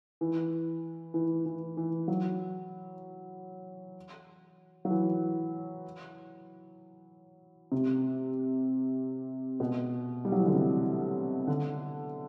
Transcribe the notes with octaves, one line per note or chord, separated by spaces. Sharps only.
E3
E3
E3
E3
F#3
F#3
E3
C3
B2
G3
F#3
E3
D3
C3
D3